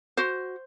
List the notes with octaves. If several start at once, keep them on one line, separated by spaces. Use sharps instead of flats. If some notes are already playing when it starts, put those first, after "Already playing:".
F#4 C5